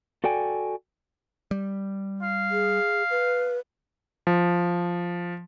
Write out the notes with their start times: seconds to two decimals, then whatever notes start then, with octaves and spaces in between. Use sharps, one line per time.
0.24 F#4 A4 D5 G5 G#5
1.51 G3
2.22 F5
2.51 G#4
3.10 B4
4.27 F3